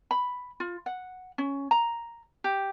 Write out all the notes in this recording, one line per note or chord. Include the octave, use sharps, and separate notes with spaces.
B5
F4
F#5
C#4
A#5
G4